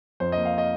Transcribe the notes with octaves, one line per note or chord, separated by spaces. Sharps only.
F2 C5
D#5
A#3
F5
D#5